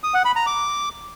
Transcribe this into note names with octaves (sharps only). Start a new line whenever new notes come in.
D#6
F#5
B5
A#5
D6